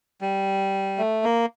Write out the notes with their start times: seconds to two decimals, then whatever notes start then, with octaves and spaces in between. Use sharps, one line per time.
0.21 G3
0.98 A3
1.24 A#3